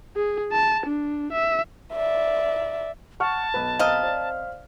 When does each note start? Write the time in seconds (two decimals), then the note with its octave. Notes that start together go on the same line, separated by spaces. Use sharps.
0.16 G#4
0.52 A5
0.86 D4
1.32 E5
1.93 D5 E5
3.20 F#5 A5 C#6 F6
3.54 B1 B4
3.79 C4 A#4 D#5 F5 F6
4.03 C5 D5